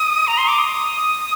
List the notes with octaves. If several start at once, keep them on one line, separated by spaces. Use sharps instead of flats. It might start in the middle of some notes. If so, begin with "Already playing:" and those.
Already playing: D#6
A#5
C6
D6
D#6